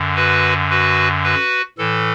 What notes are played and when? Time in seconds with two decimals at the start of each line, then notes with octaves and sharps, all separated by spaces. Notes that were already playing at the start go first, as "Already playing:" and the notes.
Already playing: F#2 D3
0.16 F#4 B4
0.70 F#4 B4
1.24 F#4 B4
1.78 A2 E3 A4